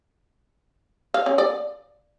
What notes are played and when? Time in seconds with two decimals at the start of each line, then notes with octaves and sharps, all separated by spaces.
1.14 F5
1.26 C#4
1.38 D5